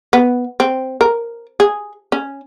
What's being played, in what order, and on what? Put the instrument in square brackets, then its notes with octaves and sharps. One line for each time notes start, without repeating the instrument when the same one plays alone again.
[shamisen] B3
C4
A#4
G#4
C#4